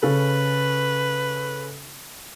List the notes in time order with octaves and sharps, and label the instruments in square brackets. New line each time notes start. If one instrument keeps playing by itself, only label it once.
[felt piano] C#3 C#4 A4 [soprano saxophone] B4